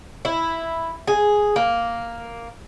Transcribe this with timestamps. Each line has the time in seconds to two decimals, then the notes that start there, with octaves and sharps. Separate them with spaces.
0.25 E4
1.07 G#4
1.56 A#3